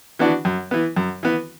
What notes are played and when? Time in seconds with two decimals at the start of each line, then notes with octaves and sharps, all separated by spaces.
0.19 E3 B3 D4 F#4
0.45 F#2
0.71 E3 B3
0.97 F#2
1.23 E3 B3